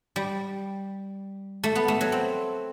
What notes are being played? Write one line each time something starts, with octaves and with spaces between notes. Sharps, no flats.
G3
A3
B3
A3
F#3
C4